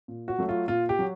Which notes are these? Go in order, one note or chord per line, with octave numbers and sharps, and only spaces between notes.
A#2
F#4
F#3 A3
F4
A#2 F4
G4
F#3